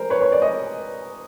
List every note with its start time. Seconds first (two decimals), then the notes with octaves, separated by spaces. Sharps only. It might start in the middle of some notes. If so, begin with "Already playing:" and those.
Already playing: A#4 C5
0.10 B4 C#5
0.22 C#5
0.32 D5
0.42 C#5 D#5